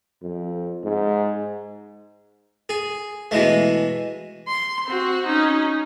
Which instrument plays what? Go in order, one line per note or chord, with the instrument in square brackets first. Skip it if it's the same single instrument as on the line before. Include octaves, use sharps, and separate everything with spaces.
[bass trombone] F2
G#2
[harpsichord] G#4
B2 E3 G#3 A3
[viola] C6
C4 F#4
C#4 D#4